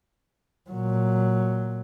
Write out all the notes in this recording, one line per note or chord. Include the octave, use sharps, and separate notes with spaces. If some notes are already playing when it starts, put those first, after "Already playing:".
A#2 F#3